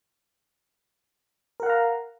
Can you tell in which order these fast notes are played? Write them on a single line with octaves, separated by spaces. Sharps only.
A#4 F#5 F5 A#5